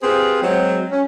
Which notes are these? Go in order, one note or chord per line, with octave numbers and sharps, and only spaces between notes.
C4 F4 G4 G#4 B4 C5
F#3 G#3 C4
C#4